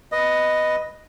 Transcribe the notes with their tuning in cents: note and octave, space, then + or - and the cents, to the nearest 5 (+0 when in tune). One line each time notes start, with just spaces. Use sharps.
B4 +0 D#5 +0